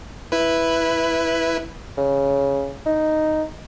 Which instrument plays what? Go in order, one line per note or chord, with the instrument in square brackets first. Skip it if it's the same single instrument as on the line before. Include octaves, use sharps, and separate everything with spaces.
[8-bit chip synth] E4 B4
[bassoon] C#3
D#4